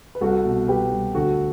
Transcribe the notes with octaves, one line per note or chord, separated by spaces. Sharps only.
B4
C2 F#4 A4
B2
C2 G4 B4
C2
D2 F#4 A4